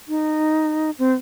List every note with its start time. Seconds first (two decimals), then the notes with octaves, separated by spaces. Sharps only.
0.08 D#4
0.99 C4